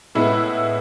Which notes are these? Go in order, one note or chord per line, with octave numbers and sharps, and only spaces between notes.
A2 G#3 B3 E4